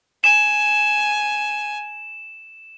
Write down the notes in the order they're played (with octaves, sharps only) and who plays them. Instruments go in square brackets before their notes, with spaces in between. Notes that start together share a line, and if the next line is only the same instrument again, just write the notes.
[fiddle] G#5 [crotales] E7